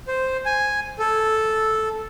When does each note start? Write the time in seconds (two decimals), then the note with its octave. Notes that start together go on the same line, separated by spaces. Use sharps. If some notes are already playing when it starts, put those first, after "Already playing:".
0.08 C5
0.46 G#5
0.99 A4